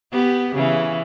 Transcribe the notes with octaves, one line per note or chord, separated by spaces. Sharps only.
B3 G4
C#3 E3